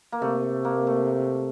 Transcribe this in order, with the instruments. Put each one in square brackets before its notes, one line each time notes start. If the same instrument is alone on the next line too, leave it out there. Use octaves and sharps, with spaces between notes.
[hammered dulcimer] A#3
[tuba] C3 [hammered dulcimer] A3
[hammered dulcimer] A#3
A3